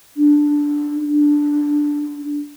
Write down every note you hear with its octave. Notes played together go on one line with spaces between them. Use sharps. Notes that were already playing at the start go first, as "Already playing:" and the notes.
D4
D4